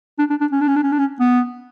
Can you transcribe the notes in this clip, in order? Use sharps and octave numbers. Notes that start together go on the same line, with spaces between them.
D4
D4
D4
C#4
D4
C#4
D4
C#4
D4
C#4
B3